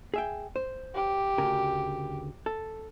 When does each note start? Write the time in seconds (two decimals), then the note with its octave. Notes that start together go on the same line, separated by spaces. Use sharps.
0.14 G#4 E5 G5
0.56 C5
0.95 G4
1.38 D2 C#3 A#4
2.46 A4